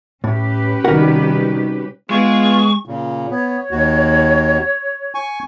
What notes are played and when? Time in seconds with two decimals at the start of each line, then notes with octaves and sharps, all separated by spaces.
0.24 A2 C#4 G4 B4
0.84 C3 D#3 G3 F#4 A#4 F#5
2.10 G#3 B3 F4 G#4 C#6
2.86 A#2 C#3
3.31 B3 C#5
3.71 D#2 F#4
5.15 G#5 C#6